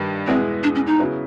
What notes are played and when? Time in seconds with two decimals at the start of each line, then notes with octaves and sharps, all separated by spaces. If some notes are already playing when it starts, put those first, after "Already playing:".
Already playing: G2 D#3 G3
0.27 E2 B2 G#3 B3 C4 E4
0.63 D4
0.75 C#4
0.87 D#4
0.99 C#3 F#3 B3 E4